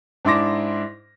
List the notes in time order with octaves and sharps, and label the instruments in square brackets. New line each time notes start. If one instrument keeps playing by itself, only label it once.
[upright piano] G#2 D4 E4 C6 D6 A#6